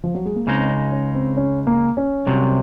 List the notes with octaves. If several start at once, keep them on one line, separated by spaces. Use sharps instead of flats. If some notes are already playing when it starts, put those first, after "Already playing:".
F3
F#3
G#3
A#3
C#2 C#3 G#3 C4 D#4
C#4
C#4
C4
C#4
A#3
C#4
C2 C3 F#3